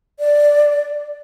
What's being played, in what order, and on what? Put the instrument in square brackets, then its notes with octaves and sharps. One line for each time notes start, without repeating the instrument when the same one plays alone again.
[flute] D5